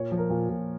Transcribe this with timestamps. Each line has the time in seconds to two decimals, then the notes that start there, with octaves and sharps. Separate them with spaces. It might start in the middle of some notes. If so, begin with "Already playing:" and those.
Already playing: A#2 C#5
0.11 F3
0.18 A#4
0.30 A#2
0.49 A#2